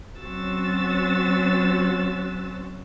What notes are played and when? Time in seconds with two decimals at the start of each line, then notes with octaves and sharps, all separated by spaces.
0.21 F#3 C4 C#4 F#4 E6 A6